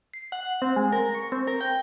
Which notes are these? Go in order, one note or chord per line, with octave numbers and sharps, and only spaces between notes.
C7
F#5
C4
G#3
A#4
C#6
C4
A#4
G5